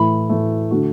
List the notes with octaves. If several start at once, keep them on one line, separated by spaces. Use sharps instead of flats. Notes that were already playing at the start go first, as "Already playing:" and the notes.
Already playing: A2 E3 A3 B5
A2 E3 A3
D3 A3 F#4